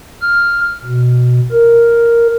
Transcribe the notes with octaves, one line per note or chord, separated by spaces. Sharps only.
F6
B2
A#4